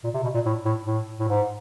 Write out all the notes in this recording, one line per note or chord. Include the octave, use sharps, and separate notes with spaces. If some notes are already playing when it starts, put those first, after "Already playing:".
A#2
C3
B2
A#2
A2
A2
A2
A2
G#2